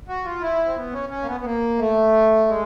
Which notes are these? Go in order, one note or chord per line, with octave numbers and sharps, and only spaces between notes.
F#4
F4
E4
C4
B3
C#4
C#4
A#3
B3
B3
A#3
A3
G#3